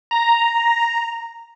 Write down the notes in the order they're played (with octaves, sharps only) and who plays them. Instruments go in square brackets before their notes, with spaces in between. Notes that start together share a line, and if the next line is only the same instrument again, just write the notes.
[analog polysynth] A#5